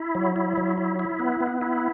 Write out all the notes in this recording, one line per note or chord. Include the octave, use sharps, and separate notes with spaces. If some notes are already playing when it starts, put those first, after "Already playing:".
Already playing: E4
F#3
E4
F#3
E4
E4
B3
B3
E4